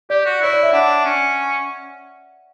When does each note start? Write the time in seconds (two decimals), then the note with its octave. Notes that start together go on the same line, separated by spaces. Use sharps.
0.10 G4 D5
0.25 F#4
0.41 E4 C#5
0.54 D5
0.63 E5
0.73 D4 F#5
1.05 C#4